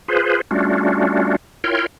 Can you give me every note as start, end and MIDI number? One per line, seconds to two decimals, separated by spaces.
0.08 0.41 65
0.08 0.41 68
0.08 0.41 71
0.08 0.41 72
0.51 1.36 55
0.51 1.36 57
0.51 1.36 61
0.51 1.36 62
0.51 1.36 65
0.51 1.36 66
1.64 1.86 64
1.64 1.86 65
1.64 1.86 70
1.64 1.86 73
1.64 1.86 79
1.64 1.86 84